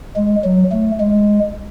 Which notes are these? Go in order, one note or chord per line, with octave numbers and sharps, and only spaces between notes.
G#3
F#3
A3
G#3